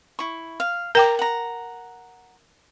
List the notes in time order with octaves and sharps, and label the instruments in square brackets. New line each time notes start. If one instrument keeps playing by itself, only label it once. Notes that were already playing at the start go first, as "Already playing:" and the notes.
[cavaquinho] E4 C#6
F5
[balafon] A#4 G5 D6 [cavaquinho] A#5
[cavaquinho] F#5 A#5